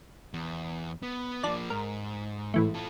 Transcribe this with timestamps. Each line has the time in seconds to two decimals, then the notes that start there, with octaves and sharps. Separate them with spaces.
0.34 E2
1.03 B3
1.43 F3 A#3 D4 D5
1.70 G#2 A#4
2.54 A2 E3 A3
2.74 F4 A4